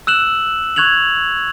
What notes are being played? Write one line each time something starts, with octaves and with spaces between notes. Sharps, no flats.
E6 F#6 E7 F#7
C#6 F#6 G#6 F7 F#7